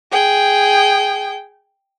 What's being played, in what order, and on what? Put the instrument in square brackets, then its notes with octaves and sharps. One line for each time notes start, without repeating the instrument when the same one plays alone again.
[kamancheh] G#4 G5